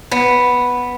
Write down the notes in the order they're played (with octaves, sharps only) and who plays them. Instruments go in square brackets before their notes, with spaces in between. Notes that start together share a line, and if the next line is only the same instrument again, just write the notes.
[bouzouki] B3